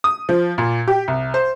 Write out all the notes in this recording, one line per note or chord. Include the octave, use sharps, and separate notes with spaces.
D#6
F3
A#2
G4
C2
C5